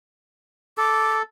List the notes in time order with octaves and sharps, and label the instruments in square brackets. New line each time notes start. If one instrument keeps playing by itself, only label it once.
[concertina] A4 [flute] D6